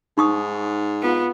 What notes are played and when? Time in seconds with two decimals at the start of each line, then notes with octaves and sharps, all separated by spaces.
0.18 G#2 D#4 C#6 D#6
1.02 B3 F4